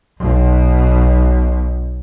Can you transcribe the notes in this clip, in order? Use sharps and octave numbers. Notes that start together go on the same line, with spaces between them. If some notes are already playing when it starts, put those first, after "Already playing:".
B1 B2